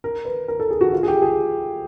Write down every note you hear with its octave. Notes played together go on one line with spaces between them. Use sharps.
A#4
B4
A#4
A4
G#4
F#4
F4
G#4
G4
G#4